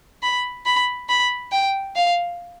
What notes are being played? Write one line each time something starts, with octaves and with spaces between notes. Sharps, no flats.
B5
B5
B5
G5
F5